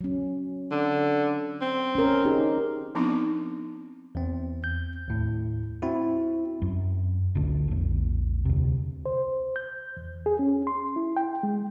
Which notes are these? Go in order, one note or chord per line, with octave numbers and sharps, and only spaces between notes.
F#3 C#4
D3
C4
C#4 A#4
D#4 G4 G#4
F3 B3 C4 D4 D#4
E2 C4
G6
D#2 A2
C4 E4 F#4
F#2
A1 D2 D3
A#1 E2
D2 C3
C5
G6
E2
G#4
C#4
C6
E4
G5
G#3